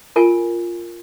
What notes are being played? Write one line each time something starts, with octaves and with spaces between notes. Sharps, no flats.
F4 A#4 G#5